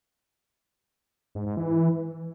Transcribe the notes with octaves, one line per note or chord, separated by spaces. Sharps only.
G#2
G#2
E3